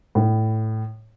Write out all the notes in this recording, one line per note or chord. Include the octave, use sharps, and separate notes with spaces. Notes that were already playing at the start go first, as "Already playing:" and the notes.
A2